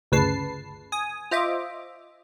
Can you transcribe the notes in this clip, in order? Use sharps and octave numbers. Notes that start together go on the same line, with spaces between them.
G1 D2 C#3 B4 A5 C7
G#5 D#6
F4 C5 D#5 E5 D6